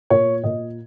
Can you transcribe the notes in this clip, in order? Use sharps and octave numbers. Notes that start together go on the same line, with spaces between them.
A#2 C#5
A#2 D#5